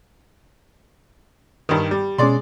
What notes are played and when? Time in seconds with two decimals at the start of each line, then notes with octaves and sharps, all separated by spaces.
1.69 G2 D#3
1.91 G3
2.18 B2 G#3 C#4 D5 C6